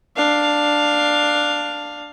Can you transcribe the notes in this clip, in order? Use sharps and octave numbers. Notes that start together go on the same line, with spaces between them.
D4 F5